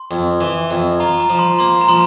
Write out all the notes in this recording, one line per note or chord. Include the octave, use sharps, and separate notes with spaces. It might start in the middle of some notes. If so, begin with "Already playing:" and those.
Already playing: C6
F2
E3
F2
F4 A#5
A#5
F3
C6
A#3 C6
A#5
F3 C6